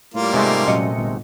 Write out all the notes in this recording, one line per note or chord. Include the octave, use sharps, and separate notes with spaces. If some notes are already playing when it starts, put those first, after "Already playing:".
A2 G3 A#3 F4
G#2 C3 G#3 A3
F#2 A#2 D#5 C#7
G1